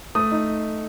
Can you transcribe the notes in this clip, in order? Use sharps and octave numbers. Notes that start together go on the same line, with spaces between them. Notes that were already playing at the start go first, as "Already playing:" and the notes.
A3 D#6
D#4